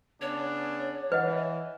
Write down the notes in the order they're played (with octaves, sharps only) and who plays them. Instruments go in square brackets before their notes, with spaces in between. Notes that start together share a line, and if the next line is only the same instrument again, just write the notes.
[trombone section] C#3 B3 D4 [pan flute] C#5
[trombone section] E3 [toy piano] B4 D#5 F#5